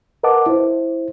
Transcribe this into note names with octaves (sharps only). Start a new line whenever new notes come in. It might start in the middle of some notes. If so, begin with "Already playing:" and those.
A#4 B4 D#5 F#5 A5 D6
E4 C5